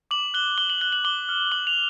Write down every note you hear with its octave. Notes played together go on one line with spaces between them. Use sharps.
D6 F#7
F#6 G7
D6 G7
F#7
F#6 G7
F#7
D6 G7
F6
D6 F#7
F7